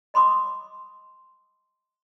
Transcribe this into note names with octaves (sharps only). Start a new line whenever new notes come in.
D#5 B5 C6 D6 D#6